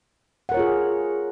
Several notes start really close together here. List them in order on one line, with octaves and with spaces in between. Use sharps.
F#5 A#4 C#5 F4 G#4